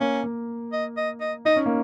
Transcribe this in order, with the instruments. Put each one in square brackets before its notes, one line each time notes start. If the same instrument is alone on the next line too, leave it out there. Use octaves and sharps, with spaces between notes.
[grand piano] A#3 [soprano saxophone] C#4
[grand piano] A#3
[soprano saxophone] D#5
D#5
D#5
[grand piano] D#4 [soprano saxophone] D#5
[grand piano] C#4
A#3